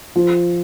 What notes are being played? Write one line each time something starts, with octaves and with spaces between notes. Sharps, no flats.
F3